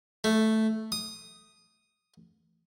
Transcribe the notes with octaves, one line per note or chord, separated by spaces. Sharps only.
A3
D#6